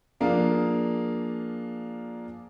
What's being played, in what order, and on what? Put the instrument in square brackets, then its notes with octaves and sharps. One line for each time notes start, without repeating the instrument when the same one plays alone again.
[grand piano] F3 A#3 D4 G#4 F5